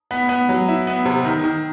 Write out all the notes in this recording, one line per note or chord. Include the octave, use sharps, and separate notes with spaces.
B3
B3
F#3
E4
B3
C3
D#3
D#3